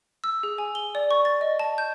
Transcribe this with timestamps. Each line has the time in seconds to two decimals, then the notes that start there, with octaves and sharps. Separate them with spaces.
0.24 E6
0.43 G#4
0.58 G#5
0.75 G7
0.95 D5
1.11 C#6
1.25 A6
1.41 D#5
1.59 A5
1.78 G6